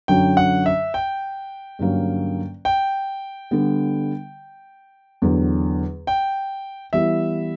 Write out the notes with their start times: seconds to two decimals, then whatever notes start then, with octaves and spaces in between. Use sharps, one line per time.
0.08 F#2 D3 F#3 G5
0.37 F#5
0.66 E5
0.94 G5
1.79 G2 D3 F#3 A#3 C#4
2.65 G5
3.51 D3 G3 B3
5.22 E2 D3 F#3
6.07 G5
6.93 E3 G3 B3 E4 G4 E5